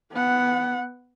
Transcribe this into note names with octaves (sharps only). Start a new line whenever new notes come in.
B3 F#5